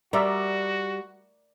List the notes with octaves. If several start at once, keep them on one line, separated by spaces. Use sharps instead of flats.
G3 F#4 A#4 D5 E5